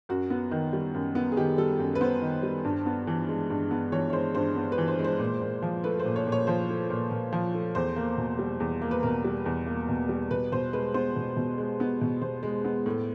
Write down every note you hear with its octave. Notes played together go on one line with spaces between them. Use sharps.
F#2 F#4
B3
D#3
G3
F#2
B3
G#4
D#3 G4
G3 A4
F#2
B4
B3 C5
D#3
G3
G2
B3
E3
G#3
G2
B3
E3 C#5
C#5
G#3 C5
G2 C5
B3
B4
E3
C5
G#3
C5
A#2
A#2
F3
A3 B4
C5
A#2
C#5
A#2
C#5
F3 C5
A3
A#2
A#2
F3
A3
E2 C5
A#3
B2
G3
E2
A#3
B4
B2 A#4
G3
E2
A#3
B2
G3
B2 B4
B2 C5
G#3 B4
B3 C5
B2
B2
G#3
B3
B2
B2 C5
G#3
B3
A2